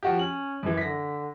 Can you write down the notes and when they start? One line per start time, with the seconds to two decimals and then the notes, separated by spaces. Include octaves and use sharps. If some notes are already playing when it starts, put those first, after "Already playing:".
0.03 F3 F#4 G4
0.19 C#4 F#7
0.63 F#2 E3
0.77 D3 A#6 B6